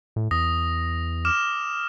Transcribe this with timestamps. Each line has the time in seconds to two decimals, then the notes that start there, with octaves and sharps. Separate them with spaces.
0.16 A2
0.31 E2 D#6 A#6
1.25 D6 F6 E7